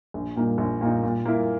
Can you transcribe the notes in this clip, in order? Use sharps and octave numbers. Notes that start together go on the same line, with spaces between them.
A#1
A#2 A#3 D#4
A#1
A#2 A#3 D#4
A#2
A#3 E4